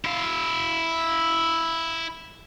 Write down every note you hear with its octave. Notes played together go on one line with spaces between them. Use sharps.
E4 F5